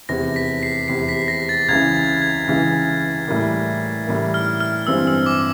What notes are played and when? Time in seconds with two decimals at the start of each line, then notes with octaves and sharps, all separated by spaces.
0.09 F1 E2 C3 A#6
0.36 B6
0.63 C7
0.88 F1 E2 C3 C7
1.09 B6
1.28 A#6
1.49 A6
1.68 C#2 C#3 E3 G#6
1.95 A6
2.22 G#6
2.48 C#2 C#3 E3
3.28 A2 E3 G3 A#3
4.07 A2 E3 G3 A#3
4.34 F6
4.61 F6
4.87 G1 G2 E3 G#3 C4 E6
5.07 E6
5.26 D6